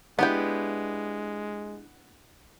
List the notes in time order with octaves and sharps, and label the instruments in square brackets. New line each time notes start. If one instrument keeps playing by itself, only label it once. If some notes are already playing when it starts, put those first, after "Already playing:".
[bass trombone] G#3 [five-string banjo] B3 G5 [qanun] D4 E4 G4